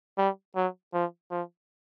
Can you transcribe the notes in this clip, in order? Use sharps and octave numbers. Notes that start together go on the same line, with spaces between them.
G3
F#3
F3
F3